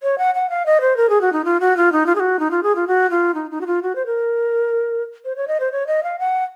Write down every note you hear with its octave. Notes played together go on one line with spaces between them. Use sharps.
C#5
F#5
F#5
F5
D#5
C5
A#4
G#4
F#4
D#4
F4
F#4
F4
D#4
F4
G#4
F#4
D#4
F4
G#4
F4
F#4
F4
D#4
D#4
F#4
F4
F#4
C5
A#4
C5
C#5
D#5
C5
C#5
D#5
F5
F#5